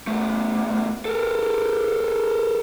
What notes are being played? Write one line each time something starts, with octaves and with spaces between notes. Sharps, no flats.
E2 A3
A4 A#4